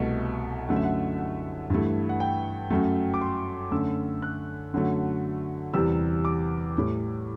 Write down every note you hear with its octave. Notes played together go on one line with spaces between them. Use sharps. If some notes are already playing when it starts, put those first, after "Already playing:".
Already playing: C2 B2 A3
F#2 D3 F#3 A3 F#5
E5
F#5
F#5
G2 E3 A3
F#5
G5
F#2 F#3 A3
D6
C6
F#2 D3 A3 E6
F#6
F#2 D3 F#3 A3
E2 C3 G3 E6
D6
A2 G3